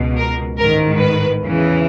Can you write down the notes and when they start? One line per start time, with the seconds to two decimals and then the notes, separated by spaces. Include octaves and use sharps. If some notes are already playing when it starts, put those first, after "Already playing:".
Already playing: C#2 B2
0.17 A#4
0.58 A1 G#2 D#3 A#4
1.00 B4
1.40 E2 C#3 E3